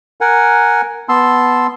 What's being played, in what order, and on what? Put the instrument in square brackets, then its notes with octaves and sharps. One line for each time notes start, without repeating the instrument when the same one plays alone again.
[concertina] A#4 F#5 G#5
B3 A5 C6 E6